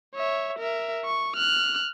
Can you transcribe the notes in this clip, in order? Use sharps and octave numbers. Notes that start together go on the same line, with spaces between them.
C#5 E5
A#4 E5
C#6
F6 F#6